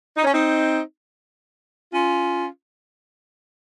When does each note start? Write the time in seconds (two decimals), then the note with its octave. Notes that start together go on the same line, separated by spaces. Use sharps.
0.17 D#4
0.25 C#4
0.32 C4 D#4
1.92 C#4 F4